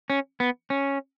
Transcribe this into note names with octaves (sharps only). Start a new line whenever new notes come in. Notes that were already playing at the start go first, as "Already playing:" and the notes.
C#4
B3
C#4